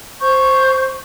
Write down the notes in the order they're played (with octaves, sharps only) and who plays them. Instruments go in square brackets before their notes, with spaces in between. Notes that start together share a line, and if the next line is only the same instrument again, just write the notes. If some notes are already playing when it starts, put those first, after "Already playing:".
[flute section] C5 C#6 G6